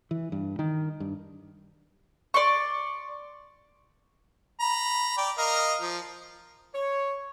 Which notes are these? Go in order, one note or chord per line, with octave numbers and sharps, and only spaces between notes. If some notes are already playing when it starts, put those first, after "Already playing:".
E3
G2
D#3
G2
D5 C6 C#6
A#5 B5
D5 G5
A#4 D#5 F5
F3
C#5